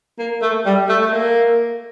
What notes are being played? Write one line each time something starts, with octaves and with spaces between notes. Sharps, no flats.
A#3
A3
G3
A3
A3
A#3